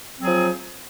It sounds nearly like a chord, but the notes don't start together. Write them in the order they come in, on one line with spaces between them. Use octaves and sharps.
C4 F#3 G#4 F3